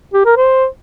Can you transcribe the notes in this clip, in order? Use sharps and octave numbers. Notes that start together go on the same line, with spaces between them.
G4
A#4
C5